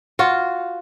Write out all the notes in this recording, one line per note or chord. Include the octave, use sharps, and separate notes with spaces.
F4 F#4